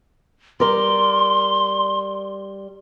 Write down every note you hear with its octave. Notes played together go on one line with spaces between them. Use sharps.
G3 A#4 D5 C6